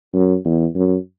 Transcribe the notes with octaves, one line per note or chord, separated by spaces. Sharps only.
F#2
E2
F#2